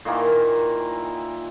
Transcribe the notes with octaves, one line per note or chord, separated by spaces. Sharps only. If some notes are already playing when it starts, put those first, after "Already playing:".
A#2 D#3 E3 A#3